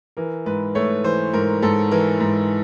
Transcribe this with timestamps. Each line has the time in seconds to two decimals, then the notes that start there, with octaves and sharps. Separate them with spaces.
0.17 E3 A#4
0.46 G#2 B4
0.75 A3 C#5
1.04 E3 C5
1.34 G#2 A#4
1.62 G#2 A4
1.91 E3 A#4
2.20 G#2